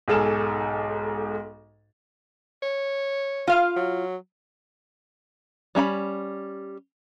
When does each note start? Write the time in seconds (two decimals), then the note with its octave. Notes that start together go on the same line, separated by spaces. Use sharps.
0.08 B1 G#2 G#4 A4 F6 E7
2.63 C#5
3.48 F4 F5
3.76 F#3
5.75 G3 C#4 E5 B5